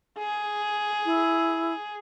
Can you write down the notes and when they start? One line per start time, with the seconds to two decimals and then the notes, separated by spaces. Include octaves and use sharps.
0.18 G#4
1.05 E4